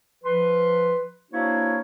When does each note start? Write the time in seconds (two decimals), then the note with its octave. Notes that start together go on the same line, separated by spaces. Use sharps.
0.24 F3 B4 C6
1.32 A#3 D4 E4 F#4 C5 C#5